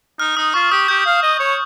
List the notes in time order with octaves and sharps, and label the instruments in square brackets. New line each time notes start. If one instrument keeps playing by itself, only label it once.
[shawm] D#4 [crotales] F6
[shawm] D#4 [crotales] D#6
[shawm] F4 [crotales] C#6
[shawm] G4 [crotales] D#6
[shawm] G4 [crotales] G6
[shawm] F5
D#5
C#5